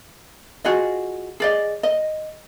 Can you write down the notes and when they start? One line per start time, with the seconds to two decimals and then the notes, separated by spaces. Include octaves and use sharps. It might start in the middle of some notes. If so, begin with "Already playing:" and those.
0.64 F4 F#4 G#4 D#5
1.40 G#4 D5 D#5
1.83 D#5